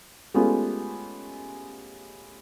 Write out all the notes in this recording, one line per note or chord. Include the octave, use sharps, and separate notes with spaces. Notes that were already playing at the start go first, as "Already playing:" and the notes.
G#3 A3 B3 C#4 F4 G4